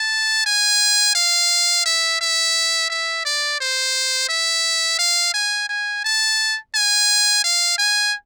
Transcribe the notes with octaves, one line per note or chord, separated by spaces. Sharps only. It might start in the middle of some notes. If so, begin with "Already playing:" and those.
Already playing: A5
G#5
F5
E5
E5
E5
D5
C5
E5
F5
G#5
G#5
A5
G#5
F5
G#5